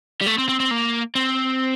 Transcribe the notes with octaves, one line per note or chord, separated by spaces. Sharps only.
G3
A3
C4
C4
C4
A#3
C4